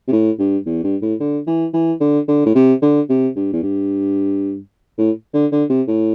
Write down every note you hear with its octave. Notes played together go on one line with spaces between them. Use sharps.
C3
A2
G2
E2
G2
A2
D3
E3
E3
D3
D3
A2
C3
D3
C3
G2
E2
G2
A2
D3
D3
C3
A2